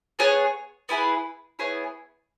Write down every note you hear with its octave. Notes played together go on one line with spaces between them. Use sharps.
B3 G#4 C#5 F#5
B3 E4 G#4 B4
B3 E4 G#4 C#5